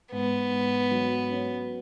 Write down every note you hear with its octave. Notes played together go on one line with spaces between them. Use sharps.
G#2 B3
G#2
F#3
C#4